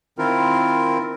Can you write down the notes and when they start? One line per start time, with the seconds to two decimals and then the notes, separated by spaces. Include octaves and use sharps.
0.18 D#3 C4 E4 F4 A#4